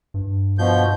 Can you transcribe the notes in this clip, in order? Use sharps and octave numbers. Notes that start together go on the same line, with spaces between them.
G2
B2 F3 G6